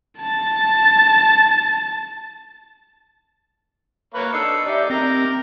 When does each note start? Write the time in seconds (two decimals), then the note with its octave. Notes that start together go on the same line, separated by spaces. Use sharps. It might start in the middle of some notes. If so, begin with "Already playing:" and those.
0.19 A5 A6
4.14 A#3 B4 C#5
4.33 D4 D#4 A4 E6 C7 C#7
4.66 D#4 G4 D5 E5
4.90 C4 G4 A#4 A#5